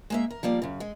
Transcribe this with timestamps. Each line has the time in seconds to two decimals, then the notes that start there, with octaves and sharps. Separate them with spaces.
0.10 G#3 A#3 E5
0.31 A#4
0.43 F3 G3 A#3 D5
0.62 F#2 C#3
0.80 G#3